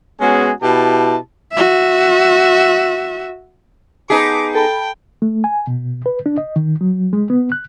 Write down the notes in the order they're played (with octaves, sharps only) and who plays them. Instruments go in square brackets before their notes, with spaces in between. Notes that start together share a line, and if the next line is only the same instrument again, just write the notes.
[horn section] G#3 B3 C#4 F#4 G#4
B2 E4 G4 A5
[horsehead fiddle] F#4 E5
[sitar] B3 D#4 G#4 [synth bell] A5 B6 C7 [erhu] D6
[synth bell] A4 A5 B5 [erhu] G5
[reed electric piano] A3
G#5
B2
B4
D4
D#5
D#3
F#3
G#3
B3
F#6